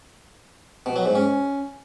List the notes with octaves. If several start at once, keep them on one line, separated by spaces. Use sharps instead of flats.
B2
F#3
G#2
C#4